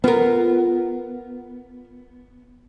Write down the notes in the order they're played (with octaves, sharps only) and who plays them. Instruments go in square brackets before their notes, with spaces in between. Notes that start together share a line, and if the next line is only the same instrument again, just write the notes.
[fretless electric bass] B3 [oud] F4 A#4